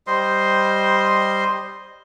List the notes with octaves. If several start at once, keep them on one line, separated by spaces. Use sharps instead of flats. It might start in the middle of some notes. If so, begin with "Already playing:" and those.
G3 C5 D#5 C6